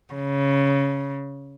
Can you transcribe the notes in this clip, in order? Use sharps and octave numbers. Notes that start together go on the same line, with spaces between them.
C#3